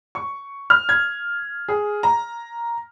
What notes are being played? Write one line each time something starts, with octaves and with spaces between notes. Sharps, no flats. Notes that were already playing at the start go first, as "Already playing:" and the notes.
C#6
F6
G#6
G#4
A#5